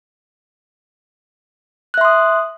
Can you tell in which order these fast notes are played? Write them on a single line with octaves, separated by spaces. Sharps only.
F#6 E5 C6 D#6